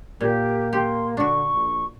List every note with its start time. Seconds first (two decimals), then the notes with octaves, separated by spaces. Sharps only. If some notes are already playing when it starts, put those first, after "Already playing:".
0.21 A#2 A#3 G4
0.73 G4 C6
1.17 D3 D4 F#4 C#6
1.53 A#1